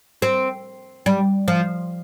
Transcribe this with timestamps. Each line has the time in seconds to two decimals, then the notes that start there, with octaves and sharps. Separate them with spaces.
0.22 C4
1.06 G3
1.48 F3